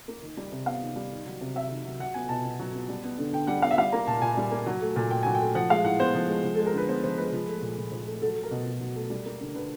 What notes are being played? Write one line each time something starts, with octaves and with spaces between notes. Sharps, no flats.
A#3
D#3
G3
C3
B3 F5
D#3
G3
D#3
F#3
C3
C3 E5
D#3
F#3
F#3 F#5
B3 G#5
B2 A5
B2
F#3
B3
G3
B3
D3
D3 G5
G3 F#5
B3 F5
E5
G3 F5
A#3 A#5
A#2 A5
A#2 G#5
G3
A#3
F#3
A3
A#2
A#2 G5
F#3 G#5
G5
A3
F3 F#5
G#3 F5
A2 F#5
B3 C5
F3
G#3
F3
G#3 A4
A#4
D3 B4
B3 C5
F3 C5
G#3 B4
F3
A3
A#2
A#2
F3
A3
F#3 A4
A3
A#4
B2
B2
F#3
A3
G3
A#3
D3
D3 B4